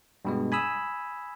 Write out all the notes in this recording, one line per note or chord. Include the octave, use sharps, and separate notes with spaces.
G2 B2 G#3
G#5 B5 D#6 E6